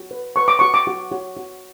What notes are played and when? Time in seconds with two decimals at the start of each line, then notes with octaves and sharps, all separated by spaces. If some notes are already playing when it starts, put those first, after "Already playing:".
Already playing: F#4
0.11 B4
0.36 B4 C#6
0.48 D6
0.59 F#4 C#6
0.74 D6
0.87 F#4
1.12 F#4
1.37 F#4